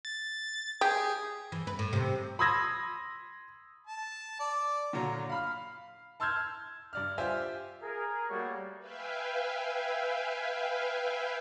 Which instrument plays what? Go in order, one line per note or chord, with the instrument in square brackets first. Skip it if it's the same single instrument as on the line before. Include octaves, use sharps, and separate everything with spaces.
[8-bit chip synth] A6
[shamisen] G4 [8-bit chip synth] G#4
[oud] E3
B4
A2
C3
[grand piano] B5 C6 D#6 E6 G#6 A#6
[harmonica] A5
D5
[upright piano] A#2 D3 F#3 A#5
F5 B5 F6
A5 C6 E6 F6 G6 G#6
G2 D5 F6
F4 G4 C5 E5 G#5
[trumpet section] G#4 A#4
G3 A3 A#3 F#4 C#5
[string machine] B4 E5 F5 G5 G#5